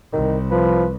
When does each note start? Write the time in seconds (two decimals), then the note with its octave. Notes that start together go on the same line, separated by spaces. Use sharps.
0.13 C2 D#3
0.51 F3 B4